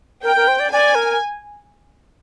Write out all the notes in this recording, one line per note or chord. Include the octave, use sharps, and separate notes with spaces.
A#4 G5
A#4
C5
D5
D5 G#5
A#4